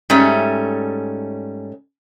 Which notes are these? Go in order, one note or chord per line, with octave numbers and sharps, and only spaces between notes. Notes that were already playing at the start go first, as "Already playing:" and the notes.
G#2 G3 A3 C#4